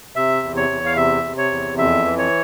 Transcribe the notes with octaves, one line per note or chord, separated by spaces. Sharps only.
C3 E5
E2
C#5
E2
F5
C3 E5
C3
C#5
E2
F2 E5
E3
C#5